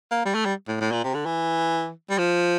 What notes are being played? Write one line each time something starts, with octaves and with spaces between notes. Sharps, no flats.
A#3
G3
A3
G3
A2
A2
A#2
C3
D3
E3
G3
F3